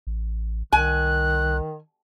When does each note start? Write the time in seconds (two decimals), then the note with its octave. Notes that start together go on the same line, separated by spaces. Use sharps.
0.07 A1
0.73 C2 D#3 G#5 F#6